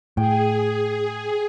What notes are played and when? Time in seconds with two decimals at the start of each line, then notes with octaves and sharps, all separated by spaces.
0.17 A2 G#4 G5